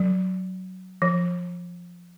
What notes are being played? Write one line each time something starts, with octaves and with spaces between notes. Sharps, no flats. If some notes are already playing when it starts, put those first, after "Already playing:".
Already playing: F#3
F3